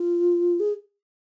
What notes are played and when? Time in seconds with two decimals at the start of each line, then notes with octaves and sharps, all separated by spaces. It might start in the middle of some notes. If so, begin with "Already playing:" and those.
Already playing: F4
0.60 G#4